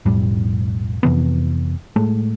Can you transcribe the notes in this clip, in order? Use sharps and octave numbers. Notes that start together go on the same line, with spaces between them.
B1 F2 A2 G3
F2 C3 E3 B3
A2 G#3 A3